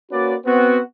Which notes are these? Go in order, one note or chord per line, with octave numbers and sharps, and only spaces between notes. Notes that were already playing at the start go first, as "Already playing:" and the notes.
A#3 C#4 F#4 B4 D5
B3 C4 F#4